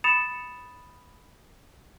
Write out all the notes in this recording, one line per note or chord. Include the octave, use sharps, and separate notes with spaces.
B5 D#6 A6 C#7 E7 F7